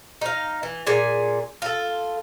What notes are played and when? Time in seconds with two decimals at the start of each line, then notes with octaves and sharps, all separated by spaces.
0.21 D#4 F5
0.63 E3
0.87 A#2 G#4 G#5
1.62 F4 A4